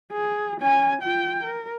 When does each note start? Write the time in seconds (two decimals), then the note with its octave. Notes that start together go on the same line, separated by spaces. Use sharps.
0.12 G#4
0.61 C#4 G#5
1.02 F4 G5
1.44 A#4